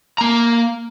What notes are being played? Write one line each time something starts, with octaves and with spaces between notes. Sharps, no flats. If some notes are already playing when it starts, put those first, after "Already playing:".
A#3 A#5